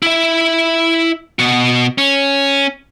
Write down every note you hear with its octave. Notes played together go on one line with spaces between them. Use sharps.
E4 E5
B2 F#4
C#4